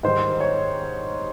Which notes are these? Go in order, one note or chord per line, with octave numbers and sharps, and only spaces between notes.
G#2 D#3 G3 C5
C#5